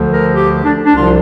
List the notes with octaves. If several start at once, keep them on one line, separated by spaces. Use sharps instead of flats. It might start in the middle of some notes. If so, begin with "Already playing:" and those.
Already playing: D2 D3 F3
A#4
G4
D4
D4
C2 C3 F3 F4